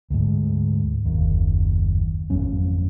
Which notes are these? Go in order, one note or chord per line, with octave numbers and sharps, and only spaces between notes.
D2 G#2
F#1 D#2
G#1 F2 F#3 C#4